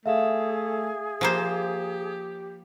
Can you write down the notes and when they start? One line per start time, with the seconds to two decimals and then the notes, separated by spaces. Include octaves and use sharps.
0.06 A3 G#4 E5 F5
1.21 F3 A#3 G4 C5